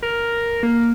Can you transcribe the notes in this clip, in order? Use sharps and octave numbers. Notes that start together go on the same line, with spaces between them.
A#4
A#3